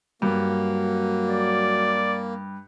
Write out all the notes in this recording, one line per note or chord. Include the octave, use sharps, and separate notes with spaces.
G2 F#3 A#3
D5